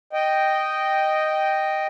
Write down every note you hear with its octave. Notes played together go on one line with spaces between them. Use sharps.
D#5 G5